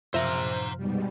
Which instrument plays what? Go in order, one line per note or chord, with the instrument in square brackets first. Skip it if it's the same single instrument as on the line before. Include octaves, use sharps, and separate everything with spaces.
[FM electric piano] F#2 C3 F3 [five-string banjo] F4 A#4 E5 [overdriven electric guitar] C5 A#5
[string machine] G#2 B2 G3